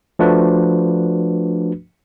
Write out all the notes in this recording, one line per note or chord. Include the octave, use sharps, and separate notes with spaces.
F3 A3 D4 F#4 B4